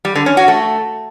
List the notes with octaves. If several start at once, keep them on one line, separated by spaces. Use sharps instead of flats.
G3
D3
C#4
F#4
A3